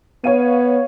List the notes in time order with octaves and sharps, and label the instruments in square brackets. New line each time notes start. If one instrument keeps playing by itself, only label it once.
[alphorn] B3 [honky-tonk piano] C#5 F5 D#7